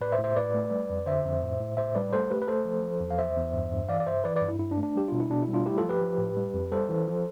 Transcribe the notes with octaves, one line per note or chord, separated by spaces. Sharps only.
A2 B4 D5
C5 E5
A2
C5 E5
A2 B4 D5
A3
G3
F2
D3 C5 E5
F2
A2
A2
A2 C5 E5
G3 B4 D5
A3 A4 C5
A3 G4 B4
B4
A3 A4 C5
F3
F3
E2
F5
E2 C5 E5
E2
G2
G2
E3 D5 F5
D5
G2 C5 E5
E3 B4 D5
B4 D5
G2
E4
G2 E4
D4
A3
D4
G3 G4
B2 F4
E4
B2 D4
E4
G3
D4 F4
A3 E4 G4
F3 F4 A4
G4 B4
F3
A2
G3
F2
G3 A4 C5
E3
F3